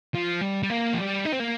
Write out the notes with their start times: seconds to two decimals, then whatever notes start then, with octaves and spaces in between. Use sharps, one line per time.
0.14 F3
0.41 G3
0.63 G3
0.70 A#3
0.94 F3
0.98 G3
1.26 D#4
1.33 C4
1.40 A#3